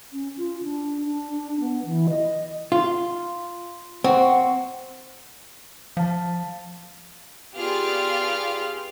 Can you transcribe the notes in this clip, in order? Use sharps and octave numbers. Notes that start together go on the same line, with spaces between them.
C#4
F4
D4
D4
B3
E3
D#5
F4
C4 F#4
F3 F5 A5
B3 F4 G4 G#4 D5 F6